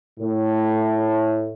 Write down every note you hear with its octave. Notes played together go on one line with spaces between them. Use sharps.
A2